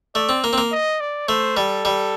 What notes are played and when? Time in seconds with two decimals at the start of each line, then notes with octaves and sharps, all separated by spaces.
0.15 A3 D5
0.29 C4
0.44 A#3
0.53 C4
0.58 A#3
0.72 D#5
1.01 D5
1.28 A3 C5
1.57 G3 A4
1.85 G3